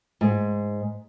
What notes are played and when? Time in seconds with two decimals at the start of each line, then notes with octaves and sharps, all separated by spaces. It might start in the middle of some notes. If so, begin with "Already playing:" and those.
0.21 G#2